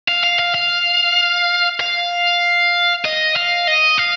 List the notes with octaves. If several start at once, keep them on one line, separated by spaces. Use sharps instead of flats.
F5
F5
F5
F5
F5
D#5
F5
D#5
F5